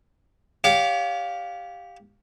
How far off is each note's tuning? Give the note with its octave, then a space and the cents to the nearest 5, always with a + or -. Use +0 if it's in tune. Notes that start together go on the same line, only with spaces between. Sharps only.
G4 +0 C#5 +35 F5 +15